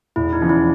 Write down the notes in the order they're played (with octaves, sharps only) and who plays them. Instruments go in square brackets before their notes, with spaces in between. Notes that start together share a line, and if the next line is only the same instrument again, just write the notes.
[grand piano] E1 [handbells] E4
[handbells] D#4
[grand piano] E2 C#3 F3
[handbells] E4